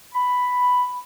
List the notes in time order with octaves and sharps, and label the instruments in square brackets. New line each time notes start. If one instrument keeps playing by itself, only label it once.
[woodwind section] B5